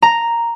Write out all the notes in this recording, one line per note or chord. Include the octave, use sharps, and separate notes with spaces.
A#5